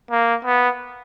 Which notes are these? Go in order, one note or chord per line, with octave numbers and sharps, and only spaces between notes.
A#3
B3